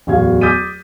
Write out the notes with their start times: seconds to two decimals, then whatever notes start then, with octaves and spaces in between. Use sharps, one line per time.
0.07 D1 E2 F#4 F5 G#6
0.41 D6 D#6 G6 A6 B6 D#7